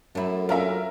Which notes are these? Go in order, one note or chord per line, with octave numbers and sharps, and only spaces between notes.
F#2 A3 E4
C#4 D4 F4 A#4 E5